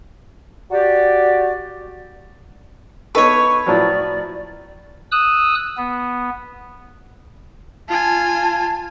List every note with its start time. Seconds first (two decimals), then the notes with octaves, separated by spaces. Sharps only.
0.71 F#4 G4 D5
3.15 B3 D#4 A4 B4 C#5 C#6
3.66 A2 F3 F#3 D5
5.11 D#6 E6 F#6
5.77 B3
7.89 F4 G#5 A5